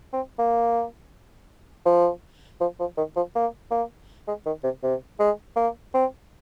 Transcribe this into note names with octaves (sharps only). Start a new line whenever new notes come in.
C4
A#3
F3
F3
F3
D#3
F3
A#3
A#3
G#3
D#3
C3
C3
G#3
A#3
C4